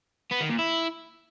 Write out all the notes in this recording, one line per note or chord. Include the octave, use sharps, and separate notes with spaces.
B3
D#3
A#2
E4